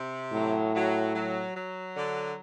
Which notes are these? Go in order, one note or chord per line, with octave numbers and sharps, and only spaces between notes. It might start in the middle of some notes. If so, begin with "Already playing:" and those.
Already playing: C3
A2 F#3
F#3
F#3
F#3
D3